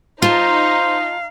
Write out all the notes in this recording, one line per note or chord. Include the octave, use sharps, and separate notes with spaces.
D#4 F4 C5 F5 A5